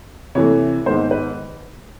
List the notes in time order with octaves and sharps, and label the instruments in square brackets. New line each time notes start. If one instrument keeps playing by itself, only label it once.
[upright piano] C3 E3 A3 C#5
G#2 D#3 G#3 B3 C5
B4